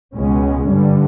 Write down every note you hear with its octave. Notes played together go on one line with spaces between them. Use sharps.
C#2 B2 G#3 C#4
G2 D3 G3